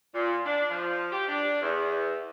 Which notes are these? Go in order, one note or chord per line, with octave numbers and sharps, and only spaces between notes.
A#2
D4
F3
G4
D4
E2